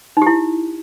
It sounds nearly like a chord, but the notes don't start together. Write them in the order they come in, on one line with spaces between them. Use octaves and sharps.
D#4 G4 E4